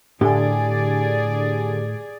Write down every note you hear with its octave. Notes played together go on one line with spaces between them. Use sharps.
A2 D3 G4 G#4 D5 G#5